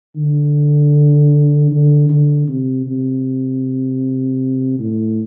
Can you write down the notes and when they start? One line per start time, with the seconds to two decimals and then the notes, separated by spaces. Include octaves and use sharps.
0.16 D3
1.71 D3
2.09 D3
2.48 C3
2.86 C3
4.79 A2